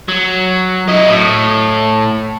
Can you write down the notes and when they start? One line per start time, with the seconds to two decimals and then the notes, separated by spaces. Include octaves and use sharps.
0.08 F#3
0.88 E4 D#5
1.09 A2